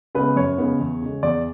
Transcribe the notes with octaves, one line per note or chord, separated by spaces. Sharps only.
C#3 G#3 B3 B4
F#2 C#5
C#3 G#3 B3
E2
C#3 G#3
E2 D5